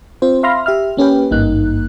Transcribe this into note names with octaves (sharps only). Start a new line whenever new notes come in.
C4 F4 C5
E5 F5 B5 C6 F6 A#6
G4 E5 F6
A#3 C#4 G4 B4 G5
G#1 G2 A#3 D#4 F#6